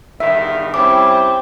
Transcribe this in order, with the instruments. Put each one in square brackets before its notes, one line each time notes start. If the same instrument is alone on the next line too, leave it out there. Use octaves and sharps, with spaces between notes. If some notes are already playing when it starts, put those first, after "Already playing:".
[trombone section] E2 G2 D#3 [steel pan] E5
[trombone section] G3 C#4 E4 [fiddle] C4 [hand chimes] D6